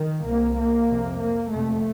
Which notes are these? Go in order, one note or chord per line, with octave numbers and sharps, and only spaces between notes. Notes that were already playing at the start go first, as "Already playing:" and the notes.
Already playing: D#3
C2 C3 A#3
A#3
F2 C3
A#3
F2 C3 A3